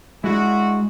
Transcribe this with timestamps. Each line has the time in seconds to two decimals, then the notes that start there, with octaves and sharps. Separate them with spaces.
0.24 G#3 D4 E4 F#4